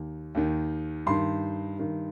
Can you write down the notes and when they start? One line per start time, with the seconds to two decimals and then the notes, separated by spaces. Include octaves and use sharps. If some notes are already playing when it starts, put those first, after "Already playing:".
Already playing: D#2 D#3
0.35 D#2 D#3
1.06 G2 D#3 C6
1.78 G2 D#3